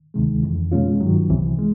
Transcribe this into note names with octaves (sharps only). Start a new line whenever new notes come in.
D2 C3 D#3 G#3
F2 C#3 E3
B2 G#3 C#4 F4
G2 D#3 F#3
C2 C3 E3
G#3